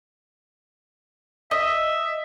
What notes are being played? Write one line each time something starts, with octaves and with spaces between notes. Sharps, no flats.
D#5 E5